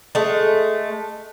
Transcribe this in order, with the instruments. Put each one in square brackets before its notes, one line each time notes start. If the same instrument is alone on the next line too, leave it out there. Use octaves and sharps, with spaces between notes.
[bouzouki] G#3 A3